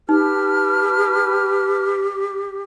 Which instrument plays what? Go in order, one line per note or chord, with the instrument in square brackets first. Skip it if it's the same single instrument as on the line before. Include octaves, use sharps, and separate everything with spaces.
[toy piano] D#4 [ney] G4 [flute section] B4 A5 F6